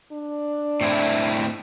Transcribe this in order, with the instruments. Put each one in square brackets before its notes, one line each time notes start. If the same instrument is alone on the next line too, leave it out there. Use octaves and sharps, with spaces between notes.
[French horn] D4
[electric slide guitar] A2 C4 E4